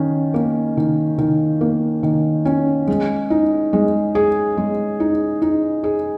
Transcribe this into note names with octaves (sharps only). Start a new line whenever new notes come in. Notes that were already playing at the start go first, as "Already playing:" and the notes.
Already playing: D#3 C#4
A#3
D#3
D#3
A#3
D#3
C#4
G#3
D#4
G#3
G#4
G#3
D#4
D#4
G#4